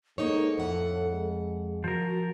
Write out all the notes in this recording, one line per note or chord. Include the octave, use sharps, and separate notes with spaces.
G#2 A#3 D#4 A4 C#5
F2 A2 F#5
G#3
F3 F#4 A#4